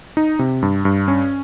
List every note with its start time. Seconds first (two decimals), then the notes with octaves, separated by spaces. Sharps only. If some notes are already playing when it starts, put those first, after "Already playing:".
0.17 D#4
0.39 C3
0.62 G2
0.85 G2
1.08 C#4